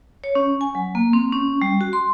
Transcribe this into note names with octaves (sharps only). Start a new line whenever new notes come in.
C#5
C#4
G#5
F#3
A#3
C4
C#4
G3
F#4
C6